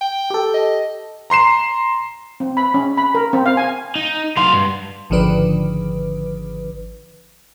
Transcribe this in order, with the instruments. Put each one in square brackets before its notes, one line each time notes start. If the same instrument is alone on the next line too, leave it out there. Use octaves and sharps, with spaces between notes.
[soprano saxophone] G5
[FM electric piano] G4 A4
[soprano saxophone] D#5
[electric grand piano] A#5 C6 C7 E7
[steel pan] C4
B5
C#4
B5
A#4
C4
F5
G#5
[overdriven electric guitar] D#4
[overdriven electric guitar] F#3 F5 [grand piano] C6
[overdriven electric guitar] G2
[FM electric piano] G#1 D3 D#3 F3 D4 B4